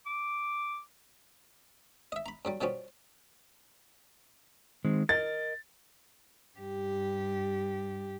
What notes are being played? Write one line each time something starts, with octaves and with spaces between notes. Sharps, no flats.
D6
D#5 E5
A#5 B5
G2 F#3 G3
B2 F3 G3 B3 C#4
D#3 G#3 C4
A#4 D#5 A6
G2 G4